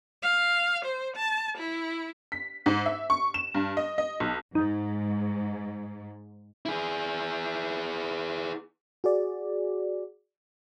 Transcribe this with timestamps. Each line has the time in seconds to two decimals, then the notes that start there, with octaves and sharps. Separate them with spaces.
0.22 F5
0.84 C5
1.16 A5
1.57 E4
2.32 B6
2.66 G#2
2.86 E5
3.10 C#6
3.34 E7
3.54 G2
3.77 D#5
3.98 D#5
4.20 B1
4.55 G#2 D#4
6.66 E4 G#4
9.04 F#4 G#4 D5